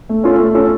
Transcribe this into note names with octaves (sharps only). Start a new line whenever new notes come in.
A3
C#4 F4 A4
A3
C#4 F4 A4